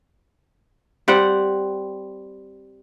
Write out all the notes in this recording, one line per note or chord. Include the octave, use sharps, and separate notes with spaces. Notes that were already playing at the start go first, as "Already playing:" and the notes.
G3 C4 F#5